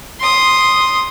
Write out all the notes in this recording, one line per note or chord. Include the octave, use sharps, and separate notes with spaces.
C6 D#6